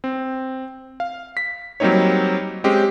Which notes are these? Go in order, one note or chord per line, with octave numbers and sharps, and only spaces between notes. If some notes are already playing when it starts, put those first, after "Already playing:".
C4
F5
B6
F#3 G3 A#3 C4 D#4 C#5
G#3 C4 C#4 G4